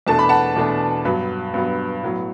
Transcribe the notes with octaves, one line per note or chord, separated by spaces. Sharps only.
E2 B2 A3 D4 A5
B5
F#5 A5
E2 B2 A3 D4
G2 F#3 B3 B4
G2 F#3 B3
A2 F#3 B3